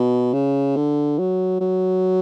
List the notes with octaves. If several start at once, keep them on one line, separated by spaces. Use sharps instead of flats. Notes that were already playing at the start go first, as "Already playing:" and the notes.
Already playing: B2
C#3
D3
F#3
F#3